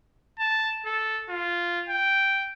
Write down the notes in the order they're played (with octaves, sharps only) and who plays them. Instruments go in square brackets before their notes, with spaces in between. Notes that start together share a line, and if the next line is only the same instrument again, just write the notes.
[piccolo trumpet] A5
A4
F4
G5